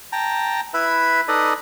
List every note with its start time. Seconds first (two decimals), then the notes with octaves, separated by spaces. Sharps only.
0.12 G5 A5 A#5
0.74 E4 B4 E5 B5
1.28 D#4 A4 B4 D5 D#5